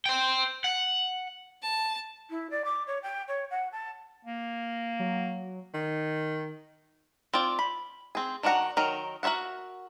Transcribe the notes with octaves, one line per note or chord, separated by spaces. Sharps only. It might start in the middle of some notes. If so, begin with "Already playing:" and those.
C5 G5
F#5
A5
E4
D5
D6
C#5
G5
C#5
F#5
A5
A#3
F#3
D#3
C4 F4 D5
B5
C4 G#4
D#3 D4 F#4 F#5 A#5
D#3 F#3 A#4
F#4 A#4 C#5 E5 F#5